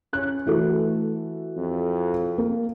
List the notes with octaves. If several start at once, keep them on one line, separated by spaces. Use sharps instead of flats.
C#4 F#6
E3 A3 F#4 A4
F2
A#3